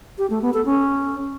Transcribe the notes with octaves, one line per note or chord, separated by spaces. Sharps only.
G4
A3
B3
A4
C#4